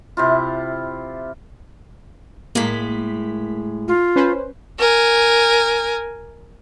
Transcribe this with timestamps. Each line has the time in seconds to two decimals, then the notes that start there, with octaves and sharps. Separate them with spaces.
0.17 C3 E4 F4
2.55 A2 G#3 A#3 B6
3.88 F4
4.16 C#4 B4 C5
4.79 A#4 G#5